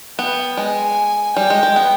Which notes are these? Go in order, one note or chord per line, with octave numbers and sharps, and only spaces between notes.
B3 G5
G#3 G#5
G3 G5
G#3
G#3
B3